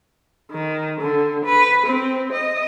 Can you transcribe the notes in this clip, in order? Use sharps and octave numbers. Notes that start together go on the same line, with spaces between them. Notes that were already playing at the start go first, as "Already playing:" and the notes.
D#3
D3
B4
C4
D#5